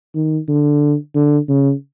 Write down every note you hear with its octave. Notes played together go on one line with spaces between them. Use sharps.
D#3
D3
D3
C#3